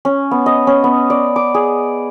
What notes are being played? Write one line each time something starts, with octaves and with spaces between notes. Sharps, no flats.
C#4
B3
D#5
C#4
B3
D5
D6
G#4